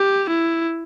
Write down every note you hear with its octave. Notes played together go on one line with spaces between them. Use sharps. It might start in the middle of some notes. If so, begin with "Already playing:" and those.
Already playing: G4
E4